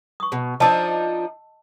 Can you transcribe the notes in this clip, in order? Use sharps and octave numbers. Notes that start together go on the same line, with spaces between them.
C#6 D#6
B2
F3 D4 D#4 D#5 A5 E6